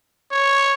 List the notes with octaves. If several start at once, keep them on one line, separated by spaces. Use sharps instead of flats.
C#5